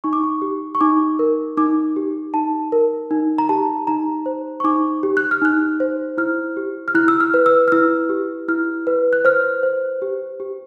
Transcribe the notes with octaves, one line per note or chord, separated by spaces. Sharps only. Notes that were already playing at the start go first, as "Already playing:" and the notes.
D#4 C#6
D6
C#6
G4
C#6
D#4 D6
A#4
D#4 D6
G4
D#4 A5
A#4
D#4
A#5
G4 A5
D#4 A#5
C5
C#6
D#4 D6
G4
F#6
F6
D#4 F#6
C5
E4 F6
G4
F6
E4 F#6
E6
F6
B4
E6
F6
E4 E6
G4
E4 F6
B4
F#6
C5 F6
C5
G4
G4